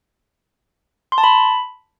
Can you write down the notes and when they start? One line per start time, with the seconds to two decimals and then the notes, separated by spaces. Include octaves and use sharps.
1.12 C6
1.18 A5
1.24 B5